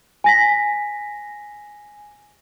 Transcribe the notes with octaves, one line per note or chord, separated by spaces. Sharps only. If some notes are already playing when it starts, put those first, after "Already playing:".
G#5 A#6 B6